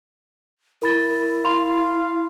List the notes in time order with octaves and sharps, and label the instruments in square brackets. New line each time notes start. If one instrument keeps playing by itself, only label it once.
[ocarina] E4 [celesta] A#4 B5 A6
[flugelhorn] F5 [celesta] B5 C6 F7